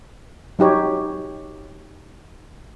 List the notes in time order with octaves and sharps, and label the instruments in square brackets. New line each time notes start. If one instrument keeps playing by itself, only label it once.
[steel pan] F#3 D#4 G4 C#5